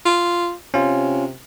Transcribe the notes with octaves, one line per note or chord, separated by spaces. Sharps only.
F4
C3 C#4 F4